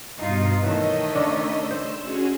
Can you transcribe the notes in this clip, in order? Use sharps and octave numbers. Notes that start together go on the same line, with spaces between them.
G2 B2 D#4 F4
D#3 E3 A3 C#5 D#5 E6
C#3 D4
C5 C6 E6
C#4 F#4 G#4